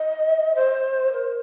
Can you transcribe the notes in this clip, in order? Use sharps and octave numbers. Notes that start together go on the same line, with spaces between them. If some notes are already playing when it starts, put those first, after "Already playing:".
Already playing: D#5
C5
A#4